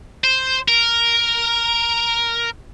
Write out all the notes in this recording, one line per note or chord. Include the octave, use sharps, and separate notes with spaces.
C5
A#4